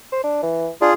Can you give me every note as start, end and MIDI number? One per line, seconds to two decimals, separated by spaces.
0.12 0.22 72
0.24 0.43 62
0.43 0.69 52
0.81 0.90 62
0.81 0.94 65
0.81 0.94 68